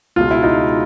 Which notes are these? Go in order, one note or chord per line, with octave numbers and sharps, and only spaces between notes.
C#2 B2 G#3 F4
E4
D#4 F4